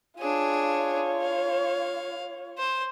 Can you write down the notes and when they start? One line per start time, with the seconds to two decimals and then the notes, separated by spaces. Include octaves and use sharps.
0.19 D4 F4 G#4 C#5
1.22 F5
2.58 C5